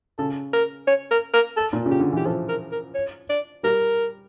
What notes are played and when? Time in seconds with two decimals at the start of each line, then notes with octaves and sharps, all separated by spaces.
0.18 C#3 A4
0.53 A#4
0.87 C#5
1.11 A#4
1.33 A#4
1.56 A4
1.73 A#2
1.86 C#3
1.91 G4
2.00 D3
2.13 E3 G4
2.26 F3 A4
2.48 A#4
2.72 A#4
2.94 C#5
3.29 D5
3.63 G3 A#4